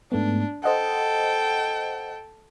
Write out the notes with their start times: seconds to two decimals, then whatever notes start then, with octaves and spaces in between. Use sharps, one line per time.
0.12 G#2 A3 B3 D4
0.64 A4 C5 D#5 F#5 G5